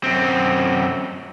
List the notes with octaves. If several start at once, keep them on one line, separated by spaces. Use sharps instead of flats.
F#2 C4